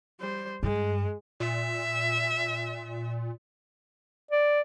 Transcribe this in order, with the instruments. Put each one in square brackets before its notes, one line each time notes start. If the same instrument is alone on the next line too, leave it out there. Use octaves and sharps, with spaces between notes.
[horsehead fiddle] G3 C5
[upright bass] G2 [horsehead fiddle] G#3
[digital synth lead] A#2 [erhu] E5
[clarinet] D5